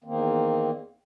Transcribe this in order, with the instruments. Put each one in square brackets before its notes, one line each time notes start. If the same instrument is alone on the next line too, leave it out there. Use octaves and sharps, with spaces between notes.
[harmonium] E2 D#3 A#3 C4